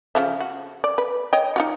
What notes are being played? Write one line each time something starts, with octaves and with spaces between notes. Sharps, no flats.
C#3 F3 E5
F#4
D5
B4
C#5 D#5 G5
D#4 F4 F#4